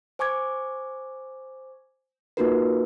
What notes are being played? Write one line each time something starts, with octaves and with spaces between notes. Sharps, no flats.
C5 G#5 C#6 D6 G#6
A#3 D#4 F4 F#4 A#4 B4